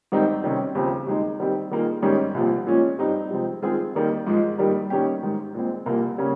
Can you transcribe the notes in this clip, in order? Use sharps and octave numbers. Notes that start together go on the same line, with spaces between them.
G#2 D#3 G3 C4 D#4
C3 D#3 G3 C#4
D#2 C#3 F3 C4
D#2 D#3 G#3 D#4
D#3 G3 C4 G4
D#3 G3 A#3 F4 G#4
G#2 D#3 G3 C#4 G4
C2 A#2 F3 C4
A#2 F3 G#3 C#4
G2 G3 C4 D#4
C3 F3 G#3 C4
D#3 G#3 C4 F4 G#4
D#2 D#3 G3 A#3
G#2 F3 G#3
G2 D#3 G3 A#3
D#3 G3 A#3 C#4 G4
G#2 D#3 G#3
A#2 G#3 C4
C2 A#2 F3 A#3 F4
C#3 G3 A#3 C#4